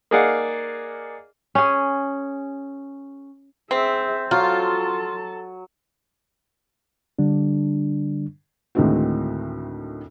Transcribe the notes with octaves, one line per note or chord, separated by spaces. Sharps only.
A#3 D#4 G#4 D5 F5 F#5
C#4 G#4
C4 G#4 E5
F#3 F4 A4 A5
D3 G3 D4
D2 A2 D#3 G#3 C4 F#4